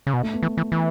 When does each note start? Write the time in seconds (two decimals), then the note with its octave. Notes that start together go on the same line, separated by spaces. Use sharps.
0.07 C#3
0.13 B2
0.23 A3
0.33 B3
0.43 E3
0.57 E3
0.72 E3